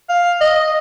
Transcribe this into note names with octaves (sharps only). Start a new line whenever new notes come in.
F5
D#5